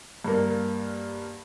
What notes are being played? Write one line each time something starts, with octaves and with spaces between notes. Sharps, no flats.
G2 A#3